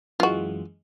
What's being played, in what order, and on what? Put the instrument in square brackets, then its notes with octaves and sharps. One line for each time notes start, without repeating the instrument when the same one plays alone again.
[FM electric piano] F#2 E3 G#3 [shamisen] F4 F#4